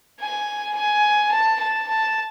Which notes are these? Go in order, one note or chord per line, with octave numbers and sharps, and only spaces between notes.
G#5
G#5
A5
A5
A5